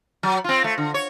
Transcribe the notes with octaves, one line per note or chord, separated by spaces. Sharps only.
F#3
C4 F4
A3
D3
C#5